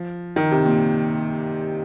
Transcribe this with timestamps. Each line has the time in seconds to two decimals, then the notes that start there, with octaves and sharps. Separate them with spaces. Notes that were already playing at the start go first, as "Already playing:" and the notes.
Already playing: F3
0.36 D#3
0.52 C3
0.66 A#2